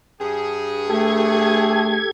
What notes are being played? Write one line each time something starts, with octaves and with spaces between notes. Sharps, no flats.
G2 G#4
A3 G4 A4 G#6